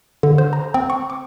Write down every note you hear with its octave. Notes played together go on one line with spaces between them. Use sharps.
D3
C5
A#5
C4
C#6
D6